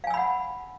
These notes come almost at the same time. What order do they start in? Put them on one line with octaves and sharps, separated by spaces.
F5 G#5 E6 B5 F#5